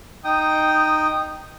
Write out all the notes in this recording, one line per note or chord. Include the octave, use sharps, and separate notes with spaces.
D#4 G5 D#6